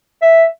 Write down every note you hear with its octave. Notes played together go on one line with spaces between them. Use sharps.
E5